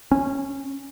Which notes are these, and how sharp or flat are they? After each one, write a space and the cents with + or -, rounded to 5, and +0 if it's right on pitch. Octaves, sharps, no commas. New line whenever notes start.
C#4 -10